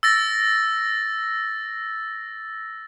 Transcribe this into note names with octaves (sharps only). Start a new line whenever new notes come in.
E6 A6 A#6